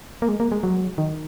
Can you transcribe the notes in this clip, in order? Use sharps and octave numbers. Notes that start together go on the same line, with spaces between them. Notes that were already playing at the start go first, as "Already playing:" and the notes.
A#3
G#3
A#3
G#3
F#3
D#3